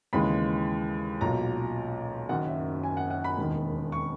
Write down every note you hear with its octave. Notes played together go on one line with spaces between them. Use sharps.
D#2 C#3 E3 G#3 B5
B1 A#2 F#3 A#5
F#1 F#2 D#3 F#3 F#5
E5
G#5
F#5
F#5
B5
E1 D#2 D#3
C#6